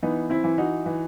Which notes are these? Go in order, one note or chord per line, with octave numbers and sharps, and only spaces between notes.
E3 B3 D#4
C4 E4
E3
D#4 F#4
E3